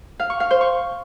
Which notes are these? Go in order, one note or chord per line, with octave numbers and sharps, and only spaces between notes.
F5
C#6
F5
C5
C#6